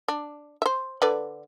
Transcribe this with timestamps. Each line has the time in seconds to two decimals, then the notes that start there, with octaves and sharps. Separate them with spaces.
0.08 D4
0.62 C5 E5
1.02 D3 B4 D5